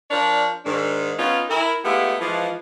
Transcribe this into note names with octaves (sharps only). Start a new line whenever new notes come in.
F3 D4 A#4 C#5 D5
G#2 D#3 D4
B3 C#4 D#4 F4
E4 A#4
G#3 A3 B3 E4 F4 G4
E3 F3 G#3